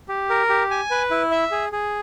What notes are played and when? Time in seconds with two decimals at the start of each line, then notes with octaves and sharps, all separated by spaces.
0.09 G4
0.30 A#4
0.49 G4
0.71 G#5
0.91 B4
1.11 E4
1.31 E5
1.52 G#4
1.72 G#4